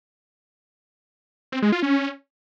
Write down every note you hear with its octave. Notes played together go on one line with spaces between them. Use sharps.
C4
G#3
F4
C#4